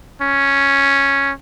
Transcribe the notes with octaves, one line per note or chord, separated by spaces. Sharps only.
C#4